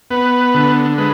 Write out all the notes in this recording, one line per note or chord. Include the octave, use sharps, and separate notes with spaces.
B3 B4
D3
G#3 B4